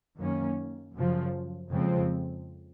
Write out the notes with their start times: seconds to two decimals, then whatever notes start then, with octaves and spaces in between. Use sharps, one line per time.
0.18 F#2 D#3 A#3 C#4
0.95 F#2 C#3 F3
1.70 F2 C#3 F3 G#3 C4